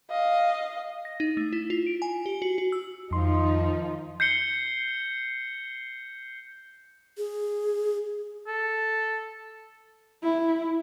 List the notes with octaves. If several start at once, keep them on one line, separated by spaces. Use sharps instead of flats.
D#5 F5
A#6
D#4
A3
E4
F4
D7
G#5
G4
F#4
F#4
E6
F2 D#3 F3 D#4 C6
G6 C7 C#7 G7
G#4
A4
E4